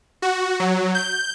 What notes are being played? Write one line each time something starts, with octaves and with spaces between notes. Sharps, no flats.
F#4
F#3
G6